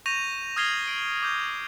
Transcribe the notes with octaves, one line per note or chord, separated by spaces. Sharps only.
C#6 G6 A#6 D#7 F7
D#6 F6 G#6 C7 F7 G7
D7
D6 G6